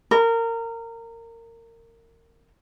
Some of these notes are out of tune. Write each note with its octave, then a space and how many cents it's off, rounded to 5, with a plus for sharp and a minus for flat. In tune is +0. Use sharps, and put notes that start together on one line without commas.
A#4 -25